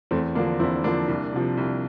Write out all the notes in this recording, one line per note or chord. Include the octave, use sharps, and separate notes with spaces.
E2 A3 C4
D3 F3 A#3 D4
E2 C4 E4
D3 F3 A#3 D4
C2
C3 F3
C2